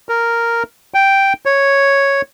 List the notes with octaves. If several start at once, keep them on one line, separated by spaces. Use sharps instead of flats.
A#4
G5
C#5